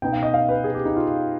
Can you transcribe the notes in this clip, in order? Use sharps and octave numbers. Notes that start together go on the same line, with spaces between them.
B2 B3 D#4 G5
F5
D#5
F5
B4
G#4
G4
D#4
F4